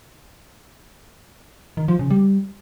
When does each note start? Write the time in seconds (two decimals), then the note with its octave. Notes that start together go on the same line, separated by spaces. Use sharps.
1.77 D#3
1.88 F3
1.99 C#3
2.10 G3